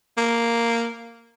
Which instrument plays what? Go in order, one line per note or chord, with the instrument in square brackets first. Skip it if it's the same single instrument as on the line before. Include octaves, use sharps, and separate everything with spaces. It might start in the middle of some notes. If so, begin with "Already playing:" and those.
[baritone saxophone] A#3